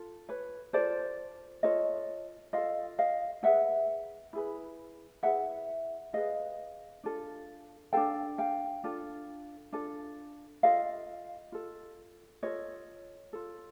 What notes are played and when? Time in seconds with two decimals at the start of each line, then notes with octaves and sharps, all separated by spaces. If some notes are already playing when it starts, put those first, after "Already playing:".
Already playing: F4 A4
0.29 B4 C#5
0.73 F4 A4 C5 D5
1.63 F4 A4 C#5 D#5
2.53 F4 A4 D#5 F5
2.99 D#5 F5
3.43 E4 G#4 B4 E5 F#5
4.33 E4 G#4 B4
5.23 E4 G#4 B4 E5 F#5
6.13 E4 G#4 B4 D#5 F5
7.04 D4 F4 A4
7.93 D4 F4 A4 F5 G5
8.38 F5 G5
8.84 D4 F4 A4
9.73 D4 F4 A4
10.63 F4 A4 D#5 F5
11.52 F4 A4
12.43 F4 A4 C#5 D#5
13.33 F4 A4